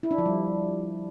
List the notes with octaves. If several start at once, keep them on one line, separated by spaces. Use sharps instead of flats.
E4
D4
F3
G3